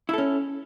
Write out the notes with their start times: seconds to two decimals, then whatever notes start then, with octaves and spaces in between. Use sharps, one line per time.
0.09 E4
0.13 A4
0.18 C#4